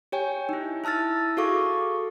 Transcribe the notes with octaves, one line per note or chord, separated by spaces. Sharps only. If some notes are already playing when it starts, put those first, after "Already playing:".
G4 C#5 G5 G#5
D#4 E4
E4 A5 E6 F6 A6
F#4 G#4 A4 F5 C#6 D6